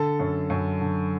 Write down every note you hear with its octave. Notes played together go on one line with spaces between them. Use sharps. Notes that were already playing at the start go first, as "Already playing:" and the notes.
Already playing: D3 A4
F#2
F#2
D3